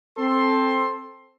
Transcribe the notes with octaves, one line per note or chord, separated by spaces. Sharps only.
C4 A4 C6